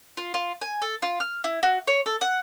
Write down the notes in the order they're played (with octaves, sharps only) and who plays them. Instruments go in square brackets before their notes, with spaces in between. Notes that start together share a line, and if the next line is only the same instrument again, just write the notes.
[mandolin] F4
F4
G#5
A4
F4
F6
E4
F#4
C#5
A4
F#5